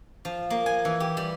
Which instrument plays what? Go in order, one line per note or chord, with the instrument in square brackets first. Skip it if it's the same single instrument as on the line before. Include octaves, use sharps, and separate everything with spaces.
[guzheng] F3
A#3
G#5
E3
G4
G3